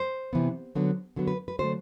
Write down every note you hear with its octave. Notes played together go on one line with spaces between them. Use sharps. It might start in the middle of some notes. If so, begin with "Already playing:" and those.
Already playing: C5
C3 E3 B3
D3 F#3 B3
D3 F#3 B3
B4
B4
D3 F#3 A3 C5